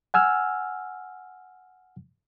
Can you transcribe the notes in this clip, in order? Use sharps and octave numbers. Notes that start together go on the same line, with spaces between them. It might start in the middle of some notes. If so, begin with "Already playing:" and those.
F#5 G#5 E6 F6